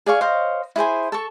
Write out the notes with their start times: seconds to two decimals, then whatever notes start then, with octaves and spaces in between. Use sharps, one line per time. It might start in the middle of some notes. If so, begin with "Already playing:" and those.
0.06 G#4 D5 F5 C#6
0.21 C5 C#5 D#5 F5
0.76 E4 G#4 C5 G#5
1.12 A4 A5 C#6